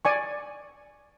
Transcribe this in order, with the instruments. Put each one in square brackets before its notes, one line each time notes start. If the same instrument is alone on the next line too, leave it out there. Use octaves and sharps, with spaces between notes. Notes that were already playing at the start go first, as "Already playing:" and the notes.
[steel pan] D5 G#5 C#6